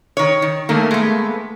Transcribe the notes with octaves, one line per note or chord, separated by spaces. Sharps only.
D#3 C#5
D#3
D#3 A3 A#3 A#4
G#3 B3